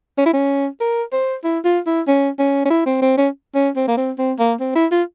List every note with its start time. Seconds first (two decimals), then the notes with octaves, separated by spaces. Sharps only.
0.18 C#4
0.26 E4
0.33 C#4
0.81 A#4
1.13 C5
1.44 E4
1.65 F4
1.86 E4
2.07 C#4
2.39 C#4
2.65 C#4
2.70 E4
2.86 C4
3.02 C4
3.18 C#4
3.55 C#4
3.76 C4
3.88 A#3
3.97 C4
4.18 C4
4.39 A#3
4.60 C4
4.76 E4
4.92 F4